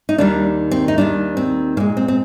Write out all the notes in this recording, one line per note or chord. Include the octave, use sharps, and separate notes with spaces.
D#4
D#2 D#3 G3 D4
C4
D#4
D#2 D#3 G3 D4
C4
A#2 G#3 A#3
C4
C4